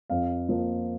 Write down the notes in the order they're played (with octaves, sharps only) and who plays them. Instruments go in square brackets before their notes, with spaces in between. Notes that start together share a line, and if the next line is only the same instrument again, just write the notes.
[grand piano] F2 F5
F3 A#3